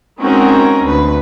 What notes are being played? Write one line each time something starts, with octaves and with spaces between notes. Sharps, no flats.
G#3 C4 C#4 D#4 F#4 A#4
D2 B4